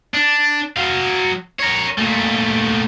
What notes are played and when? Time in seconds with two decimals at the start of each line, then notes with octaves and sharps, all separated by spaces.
0.14 D4
0.76 F#3 F5
1.59 A#4 C#5
1.98 A#2 A3